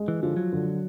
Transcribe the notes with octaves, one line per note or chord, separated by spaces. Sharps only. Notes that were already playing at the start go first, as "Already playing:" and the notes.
Already playing: G#3
E3
D3 F3
F#3
D3